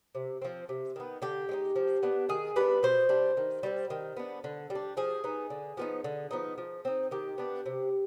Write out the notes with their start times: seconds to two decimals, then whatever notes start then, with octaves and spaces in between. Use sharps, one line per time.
0.15 C3
0.42 F3 C4
0.69 C3
0.96 D#3 B3
1.22 D3 G4
1.49 G#3 C4 D#4
1.76 F3
2.03 B3 D4
2.29 D#3 G#4
2.56 G3 B3 D4 B4
2.83 B2 C5
3.09 G3 D4
3.37 D#3
3.63 G3 C4
3.90 D#3
4.17 B3 D4
4.44 D3
4.70 G3
4.75 D4
4.97 F3 G#4
5.24 B3 D#4
5.50 D3
5.77 F3 B3 D#4
6.04 D3
6.31 F3 B3 D#4
6.58 F3
6.85 C4 D#4
7.11 D#3 G4
7.38 B3 D4
7.66 C3